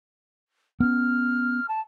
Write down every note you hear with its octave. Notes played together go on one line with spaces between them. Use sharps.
B3 C#4 F6
A5